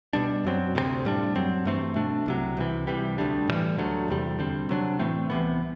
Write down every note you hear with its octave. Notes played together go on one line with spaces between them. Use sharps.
B2 G3 D4
F#2 F#3 C4
D2 C3 G3 C4
A2 G3 D4
F#2 F#3 C4
G2 E3 A3 C4
B2 A3 D4
C2 C3 F#3
C2 C3 E3
C2 C3 E3 G3
D2 D3 G3 D4
A2 E3 G3
D2 D3 F#3 A3
E2 C3 G3
D2 D3 G3 C4
C3 F#3 B3 D4
A2 E3 A3 C4
C2 C3 E3 B3